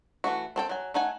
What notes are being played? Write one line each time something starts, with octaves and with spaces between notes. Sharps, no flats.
E3 A3 F#4
C4 A4 G5
F#3 G#5
A3 D#4 F#5 G#5